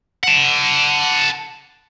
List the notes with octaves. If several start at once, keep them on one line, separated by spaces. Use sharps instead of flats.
F#5 A5